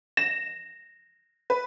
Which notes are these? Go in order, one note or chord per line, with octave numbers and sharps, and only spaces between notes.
A#6 E7
B4